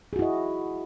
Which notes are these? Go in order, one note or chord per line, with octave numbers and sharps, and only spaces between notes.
E4 F#4 G#4 D#5